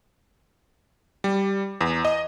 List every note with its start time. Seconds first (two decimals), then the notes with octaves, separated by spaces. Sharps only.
1.24 G3
1.81 E2
2.05 D#5